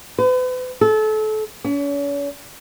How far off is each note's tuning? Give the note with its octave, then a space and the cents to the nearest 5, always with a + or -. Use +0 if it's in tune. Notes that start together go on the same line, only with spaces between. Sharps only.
B4 +40
A4 -30
C#4 +40